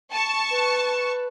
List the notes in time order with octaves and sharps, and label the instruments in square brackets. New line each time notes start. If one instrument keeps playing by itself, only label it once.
[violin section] A5 C#6
[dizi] B4